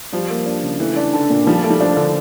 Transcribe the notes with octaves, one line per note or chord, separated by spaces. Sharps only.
F3 G3
A#3
D4
C#3
E3 A3
D4
D3 A4
A#2
F3 G3
A3
G3
F3 D4
D3